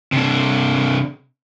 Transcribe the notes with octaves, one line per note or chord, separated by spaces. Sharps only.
C3 D4